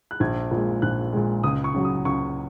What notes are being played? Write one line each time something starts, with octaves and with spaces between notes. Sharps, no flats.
F#6
A#1 G#6
A#2 G#3
A#1 F#6
A#2 G#3
C#2 D#6
C#6
C#3 F#3
D#6
C#2 C#6